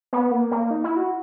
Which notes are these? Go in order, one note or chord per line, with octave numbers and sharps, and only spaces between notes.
B3
A#3
A#3
D#4
E4
F#4